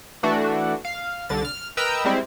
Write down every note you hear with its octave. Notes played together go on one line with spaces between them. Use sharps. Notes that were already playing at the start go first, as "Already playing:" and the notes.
E3 A3 D4 F#4
F5
C2 D3 A6
F6
A#4 B4 D#5 G5 A#5 E6
G3 G#3 C4 E4